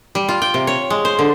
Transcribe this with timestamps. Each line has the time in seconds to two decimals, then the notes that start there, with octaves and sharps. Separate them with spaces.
0.15 G3
0.29 F4
0.42 G5
0.54 C3
0.67 C#5
0.90 G#3
1.05 C5
1.19 D3